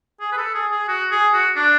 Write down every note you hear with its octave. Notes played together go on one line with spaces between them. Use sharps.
G#4
B4
A4
G#4
G#4
F#4
G#4
F#4
D4